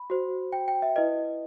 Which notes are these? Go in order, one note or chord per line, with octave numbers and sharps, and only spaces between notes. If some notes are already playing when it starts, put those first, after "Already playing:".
Already playing: B5
F#4 C5
G5
G5
E5
E4 B4 D#5